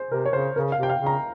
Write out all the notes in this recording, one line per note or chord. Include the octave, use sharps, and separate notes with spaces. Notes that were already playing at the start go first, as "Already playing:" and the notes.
Already playing: G#4 C5
C3 A#4
C#5
C#3 C5
C#3 A#4
F5
C3
G5
F5
C#3
A#5